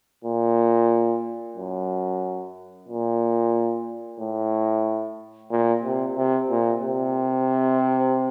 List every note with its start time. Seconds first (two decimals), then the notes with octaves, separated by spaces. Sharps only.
0.25 A#2
1.57 F#2
2.88 A#2
4.20 A2
5.51 A#2
5.84 C3
6.17 C3
6.50 A#2
6.83 C3